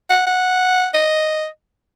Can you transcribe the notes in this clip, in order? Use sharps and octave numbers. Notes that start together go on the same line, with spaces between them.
F#5
F#5
D#5